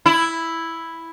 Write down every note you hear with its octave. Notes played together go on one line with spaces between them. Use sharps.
E4